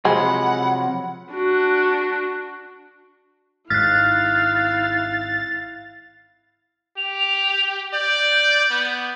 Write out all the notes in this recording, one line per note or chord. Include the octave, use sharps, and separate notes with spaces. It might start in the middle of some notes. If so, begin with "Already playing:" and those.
C3 F3 F#3 G#3 F#5 B5
D4 F#4
G#1 G#2 E4 F5 F6 F#6 A6
G4 F7
D5 G6
B3